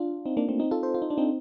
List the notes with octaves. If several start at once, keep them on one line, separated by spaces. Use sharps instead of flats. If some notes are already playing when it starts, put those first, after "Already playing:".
Already playing: D4 F4
C4 D#4
A#3 D4
A3 C4
C4 D#4
F4 A4
A4 C5
F4
D#4
D4
C4 D#4